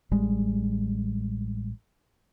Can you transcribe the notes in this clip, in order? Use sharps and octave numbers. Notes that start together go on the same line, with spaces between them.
A1 G3 G#3